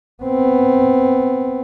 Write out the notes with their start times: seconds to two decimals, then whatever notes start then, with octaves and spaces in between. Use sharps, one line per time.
0.24 B3 C4